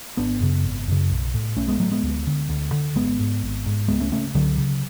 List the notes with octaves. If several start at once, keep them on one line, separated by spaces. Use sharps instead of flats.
G#1 B3 D4
F#2 C#3
G#1
F#2 C#3
B1
A2
B1 A3 C#4
G#3 B3
A2 F#3 A3
G#3 B3
D2
D3
D2
D3
G#1 G#3 B3
G#2
G#1
G#2
C#2 G#3 B3
A3 C#4
C#3 A3 C#4
C#2 D3 F#3
C#3